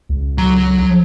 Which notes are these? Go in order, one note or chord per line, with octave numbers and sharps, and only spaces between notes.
C#2
F#3 A#5